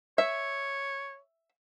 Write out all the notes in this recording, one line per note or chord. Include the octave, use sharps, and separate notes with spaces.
C#5 E5